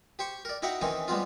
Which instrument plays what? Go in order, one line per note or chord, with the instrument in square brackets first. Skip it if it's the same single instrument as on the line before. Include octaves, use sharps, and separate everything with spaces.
[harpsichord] G4 C5 C#6
A#4 D5
D#4 E4 F#4 F#5 G5 A#5
D#3 E3 C4 C#4 D#4
G3 G#3 B3 C4 F4